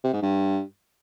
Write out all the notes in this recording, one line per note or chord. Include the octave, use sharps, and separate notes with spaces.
C3
G#2
G2